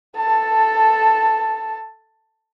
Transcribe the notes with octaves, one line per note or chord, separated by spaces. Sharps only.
A4 A5